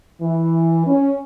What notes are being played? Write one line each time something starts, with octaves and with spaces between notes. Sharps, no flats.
E3
C#4